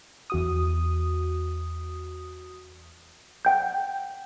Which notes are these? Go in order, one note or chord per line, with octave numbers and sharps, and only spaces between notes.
E2 F#4 D#6
F#5 G5 G6